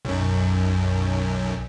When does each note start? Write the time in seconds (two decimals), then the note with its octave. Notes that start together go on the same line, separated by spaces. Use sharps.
0.05 B1 F#2